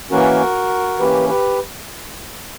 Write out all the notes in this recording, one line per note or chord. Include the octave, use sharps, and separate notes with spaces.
E3 A#3 C#4 F#4 A#4
E3 A#3 C#4 G4 B4
G4 B4